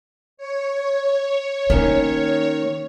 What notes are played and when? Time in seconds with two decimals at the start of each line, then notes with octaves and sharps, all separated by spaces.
0.37 C#5
1.70 D#3 A#3 C#4